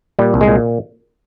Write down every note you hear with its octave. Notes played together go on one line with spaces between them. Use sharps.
A#2 G3
C2
G#3
A#2